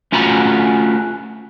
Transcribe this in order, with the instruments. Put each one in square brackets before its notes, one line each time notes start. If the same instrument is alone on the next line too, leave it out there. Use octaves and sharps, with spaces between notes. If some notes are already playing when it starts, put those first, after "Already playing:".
[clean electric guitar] A3 C#4 F4 F#4 A#5 B5